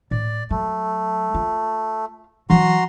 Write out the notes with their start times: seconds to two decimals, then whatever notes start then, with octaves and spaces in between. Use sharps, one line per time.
0.11 A2 D5
0.51 F#3 A3
1.34 F4
2.50 E3 F#3 F#4 A#5 C6